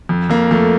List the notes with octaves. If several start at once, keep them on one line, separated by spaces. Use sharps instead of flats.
F2
F2 A#3
F2 A3